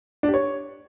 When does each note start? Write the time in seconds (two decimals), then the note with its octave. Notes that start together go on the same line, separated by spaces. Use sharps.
0.23 D4
0.28 G4
0.34 C#5